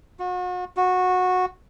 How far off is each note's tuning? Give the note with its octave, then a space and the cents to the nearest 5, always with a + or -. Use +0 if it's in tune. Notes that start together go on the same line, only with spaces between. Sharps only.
F#4 -40
F#4 -15